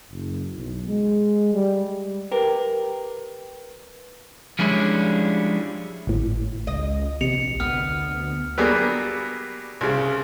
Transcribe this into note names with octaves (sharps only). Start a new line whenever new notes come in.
F#1
B1
G#3
G3
G4 A#4 B4
F3 G3 G#3 C#4 D4 E4
G#1 A2
C#2 D#5
A#1 C3 C#7 F7
D2 B3 F6
F#3 G3 A#3 B3 D4 G#4
C2 C#3